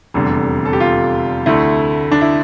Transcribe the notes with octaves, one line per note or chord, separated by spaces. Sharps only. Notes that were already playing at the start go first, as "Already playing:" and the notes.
F1 E2 D3 G3 A4
A4
G4
F4
D2 D3 A3 E4
D4
E4